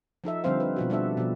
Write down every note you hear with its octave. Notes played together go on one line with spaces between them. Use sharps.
F3 D#4 A4 E5
D3 F3 G3 C4 C5 F5
B4
B2 F3 F#4
G3 D4 A4 E5
B2 F3